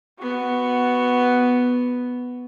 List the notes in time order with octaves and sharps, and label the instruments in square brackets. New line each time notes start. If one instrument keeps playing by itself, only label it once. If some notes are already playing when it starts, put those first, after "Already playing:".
[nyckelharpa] B3 F#4